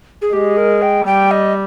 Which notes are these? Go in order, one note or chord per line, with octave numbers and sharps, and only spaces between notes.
G#4
G#3 G4
A#4
G5
G3 G5
D#5